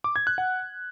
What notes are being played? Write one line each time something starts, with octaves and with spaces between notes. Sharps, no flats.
D6
G#6
F#6
F#5